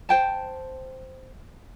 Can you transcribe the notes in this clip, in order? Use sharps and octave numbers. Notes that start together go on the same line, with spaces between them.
C5 G5 A5